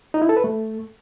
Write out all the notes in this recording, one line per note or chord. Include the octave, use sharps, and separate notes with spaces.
D#4
E4
A4
B4
A3